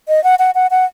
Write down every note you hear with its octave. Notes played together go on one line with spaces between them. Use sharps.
D#5
F#5
F#5
F#5
F#5